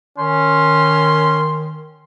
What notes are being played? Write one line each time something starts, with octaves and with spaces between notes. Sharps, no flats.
D#3 C#4 C6